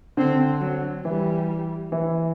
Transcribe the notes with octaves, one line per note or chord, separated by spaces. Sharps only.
D3 C4
F#3
E3 G3
E3